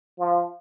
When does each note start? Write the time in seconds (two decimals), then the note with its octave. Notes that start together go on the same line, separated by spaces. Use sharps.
0.19 F3